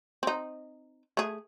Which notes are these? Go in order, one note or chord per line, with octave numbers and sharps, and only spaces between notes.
C4 D#4
A3 G#4